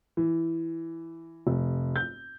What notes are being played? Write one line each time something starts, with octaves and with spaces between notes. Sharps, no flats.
E3
F1
G6